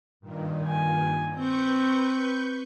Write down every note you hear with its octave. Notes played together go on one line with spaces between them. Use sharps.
G2 A#2 D#3
G#5
C4 B4 C#6 G6